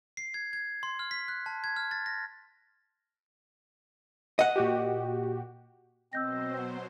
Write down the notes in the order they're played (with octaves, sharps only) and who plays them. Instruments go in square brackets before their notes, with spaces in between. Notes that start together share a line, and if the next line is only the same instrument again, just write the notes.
[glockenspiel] C7
G#6
G#6
C6
F6
B6
F#6
A5
G#6
F6
A6
A#6
[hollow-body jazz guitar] D#5 F#5
[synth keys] A#2 F#4 G4
[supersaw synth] B2 F#3 C5 [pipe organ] C4 D#5 [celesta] E6 G6 A#6
[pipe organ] B3